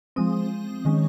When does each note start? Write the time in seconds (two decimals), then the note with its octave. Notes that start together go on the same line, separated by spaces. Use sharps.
0.16 F3 G#3 C4 D#6
0.85 D#3 G#3 C#4